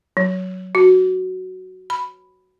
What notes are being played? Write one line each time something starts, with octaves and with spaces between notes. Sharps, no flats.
F#3
F#4
B5